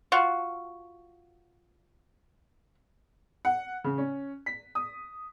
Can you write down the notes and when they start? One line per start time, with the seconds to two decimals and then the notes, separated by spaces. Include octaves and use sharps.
0.12 F4 F#4
3.45 F#5
3.84 C#3
3.98 C#4
4.46 B6
4.75 D#6